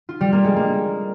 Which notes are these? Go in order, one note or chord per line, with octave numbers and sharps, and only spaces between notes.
F4
G3
A#3
G#3
A#3